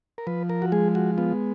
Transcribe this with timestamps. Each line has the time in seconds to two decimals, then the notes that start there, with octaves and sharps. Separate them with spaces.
0.18 A#4
0.27 F3 B4
0.49 A#4
0.62 F#4
0.72 G#3 G#4
0.95 F#4
1.18 B3 F4